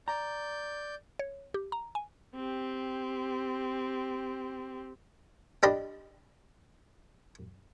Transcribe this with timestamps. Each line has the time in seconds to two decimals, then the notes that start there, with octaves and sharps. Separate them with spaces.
0.08 D5 A#5 G6
1.19 C#5
1.54 G4
1.72 A#5
1.95 G#5
2.36 C4 G4
5.63 D4 G4 D5 D#5 B5